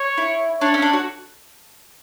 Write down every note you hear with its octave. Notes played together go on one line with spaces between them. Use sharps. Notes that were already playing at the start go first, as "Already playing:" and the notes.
Already playing: C#5
E4
D4 C#5
C#4
D4
F#4